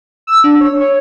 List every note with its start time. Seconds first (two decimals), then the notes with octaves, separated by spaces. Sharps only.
0.27 E6
0.44 D4
0.61 C#5
0.81 C#5